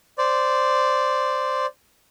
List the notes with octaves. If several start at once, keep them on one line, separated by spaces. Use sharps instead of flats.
C5 D5